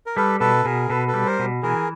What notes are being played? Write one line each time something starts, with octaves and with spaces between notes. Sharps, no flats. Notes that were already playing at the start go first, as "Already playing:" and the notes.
A#4
G3 A4 B4
B2 A4 B4
B2 G#4 A#4
B2 A4 B4
A4 B4
G3
A#4 C5
B2
E3 G#4 A#4